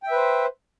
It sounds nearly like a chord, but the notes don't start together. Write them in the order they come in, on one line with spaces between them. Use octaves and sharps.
G5 E5 B4 C5